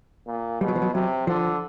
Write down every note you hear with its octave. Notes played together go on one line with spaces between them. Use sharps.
A#2
B2 G3
F#3
F3
F#3
C3 F#3
D3 F3